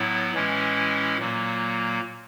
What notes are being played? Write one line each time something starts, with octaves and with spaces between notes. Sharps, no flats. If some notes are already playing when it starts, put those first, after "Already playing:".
Already playing: A2 F#3 B3 E4
A2 E3 G#3 C#4 E4
A#2 F#3 A#3